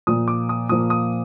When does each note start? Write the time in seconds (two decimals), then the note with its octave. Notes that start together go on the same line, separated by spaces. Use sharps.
0.07 A#2 F3 A#3 D#6
0.28 D6
0.49 D#6
0.69 A#2 F3 A#3 D#6
0.90 D#6